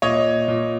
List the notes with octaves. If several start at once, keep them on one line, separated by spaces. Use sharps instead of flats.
A#2 C#5 D#5
A#2